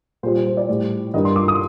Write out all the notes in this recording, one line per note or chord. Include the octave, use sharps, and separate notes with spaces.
A#2 G3 C5
C5
C5
D5
A2 G3
G2 D#3 G3 D#5
C6
D6
D#6